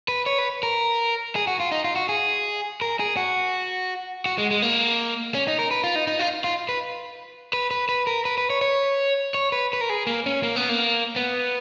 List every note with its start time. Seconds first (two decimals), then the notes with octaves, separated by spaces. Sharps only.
0.08 B4
0.26 C#5
0.38 B4
0.63 A#4
1.36 G#4
1.47 F#4
1.60 F4
1.72 D#4
1.84 F4
1.96 F#4
2.09 G#4
2.82 A#4
3.00 G#4
3.17 F#4
4.26 F#4
4.38 G#3
4.51 G#3
4.62 A#3
5.35 C#4
5.48 D#4
5.59 A#4
5.71 B4
5.84 F4
5.96 D#4
6.07 D#4
6.19 F4
6.44 F4
6.69 B4
7.53 B4
7.71 B4
7.89 B4
8.07 A#4
8.25 B4
8.38 B4
8.50 C#5
8.61 C#5
9.34 C#5
9.52 B4
9.73 B4
9.81 A#4
9.90 G#4
10.07 A#3
10.26 C#4
10.43 A#3
10.56 B3
10.69 A#3
11.16 B3